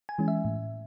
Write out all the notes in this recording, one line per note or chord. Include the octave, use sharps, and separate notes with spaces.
G#5
E3 G#3 C#4
E5
A2